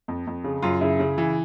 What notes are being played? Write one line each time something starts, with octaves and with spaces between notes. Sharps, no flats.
F2
F2
C#3
F#2 F4
C#3 E4
C#3
E3